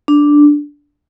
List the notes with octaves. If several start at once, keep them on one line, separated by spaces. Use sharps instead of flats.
D4